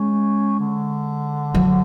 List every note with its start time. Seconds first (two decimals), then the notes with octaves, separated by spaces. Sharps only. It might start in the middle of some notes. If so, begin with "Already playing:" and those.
Already playing: G#3 C#4
0.60 D3
1.54 F#3